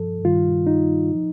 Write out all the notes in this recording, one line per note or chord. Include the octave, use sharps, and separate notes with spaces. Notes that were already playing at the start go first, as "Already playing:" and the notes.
Already playing: G2 F3 A4
G2 D#3 G3 F4
D#4
F3